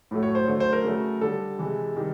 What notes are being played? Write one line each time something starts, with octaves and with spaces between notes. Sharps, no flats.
A2 F#3 A3
C#5
C5
D3 F#3 A3
C5
A#4
C#3 F#3 A3
D3 G3 A4
C3 E3 G#3
C3 D#3 G3